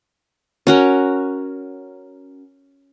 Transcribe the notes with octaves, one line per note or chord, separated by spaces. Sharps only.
C#4 F#4 A#4